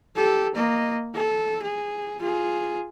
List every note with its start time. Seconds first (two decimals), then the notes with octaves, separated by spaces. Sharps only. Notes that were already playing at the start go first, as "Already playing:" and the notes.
0.16 G4 A4
0.55 A#3 D#5
1.15 A4
1.62 G#4
2.20 F4 G#4